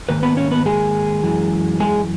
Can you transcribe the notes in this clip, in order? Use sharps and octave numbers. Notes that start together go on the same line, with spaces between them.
G#2 D#3 A#3 B4
B3 B4
C#4 C#5
B3 B4
G#3 G#4
F#2 E3 G#3
G#3 G#4